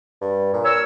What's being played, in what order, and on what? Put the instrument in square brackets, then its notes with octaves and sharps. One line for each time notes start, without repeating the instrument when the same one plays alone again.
[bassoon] G2
A#2
[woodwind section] A#4 C#5 E6